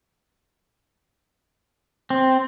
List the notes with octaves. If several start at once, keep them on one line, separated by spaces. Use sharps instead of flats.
C4